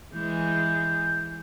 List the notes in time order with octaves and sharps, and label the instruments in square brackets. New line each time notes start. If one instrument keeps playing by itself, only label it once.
[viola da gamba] E3 G#3 [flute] G6